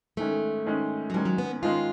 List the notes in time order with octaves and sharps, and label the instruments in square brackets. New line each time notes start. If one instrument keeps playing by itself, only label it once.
[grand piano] G#2 D#3 G#3 C#4 [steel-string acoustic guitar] A3
[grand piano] G#2 D#3 G#3 C#4
[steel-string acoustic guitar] F#3
[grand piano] G#2 D#3 G#3 C#4 [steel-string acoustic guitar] G3
[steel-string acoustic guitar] F#3
B3
[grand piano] G#2 D#3 G#3 C#4 [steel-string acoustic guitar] F4